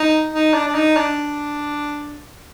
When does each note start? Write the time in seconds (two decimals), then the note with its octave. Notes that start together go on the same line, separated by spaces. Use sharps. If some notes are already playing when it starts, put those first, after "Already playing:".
Already playing: D#4
0.34 D#4
0.54 D4
0.67 D4
0.75 D#4
0.96 D4